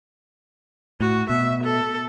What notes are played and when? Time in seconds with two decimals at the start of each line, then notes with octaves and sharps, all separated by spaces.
1.00 A2 F#4
1.30 B2 E5
1.63 A4